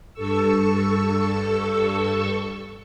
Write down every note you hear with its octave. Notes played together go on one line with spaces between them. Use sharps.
G2 A4 C#6 E6